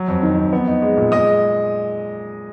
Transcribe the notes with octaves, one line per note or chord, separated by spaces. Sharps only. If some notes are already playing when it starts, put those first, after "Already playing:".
Already playing: F#3
F2
D#3
F2
B3
D#4
G#3
A#2
G#3 D#5 D#6